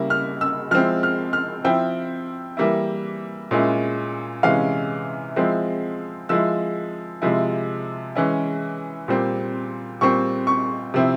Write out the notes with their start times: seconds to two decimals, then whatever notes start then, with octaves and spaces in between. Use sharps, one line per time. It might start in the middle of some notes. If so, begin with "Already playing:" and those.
Already playing: C#3 G3 A#3 E4
0.10 F6
0.41 E6
0.71 F3 G#3 C4 E4 F6
1.03 F6
1.33 F6
1.64 F3 C4 E4 G5
2.57 E3 G3 A#3 E4
3.51 A#2 G#3 C#4 E4
4.43 C3 E3 G#3 C#4 F5
5.36 F3 G#3 C4 E4
6.29 F3 G#3 E4 E6
7.22 C3 F3 G#3 E4
8.15 E3 G#3 C#4 E4
9.08 A#2 G3 C4
10.01 A#2 G3 C4 C#6
10.47 C#6
10.94 C3 F3 C4 E4